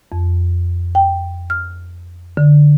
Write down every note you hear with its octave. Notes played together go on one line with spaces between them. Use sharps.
F2
G5
F6
D3